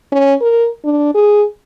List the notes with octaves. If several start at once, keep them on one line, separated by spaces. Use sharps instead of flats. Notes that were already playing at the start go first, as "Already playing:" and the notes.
C#4
A#4
D4
G#4